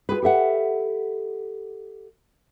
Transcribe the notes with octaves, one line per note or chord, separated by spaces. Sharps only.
F4 G4 G#4 B4
G4 A4 E5 F#5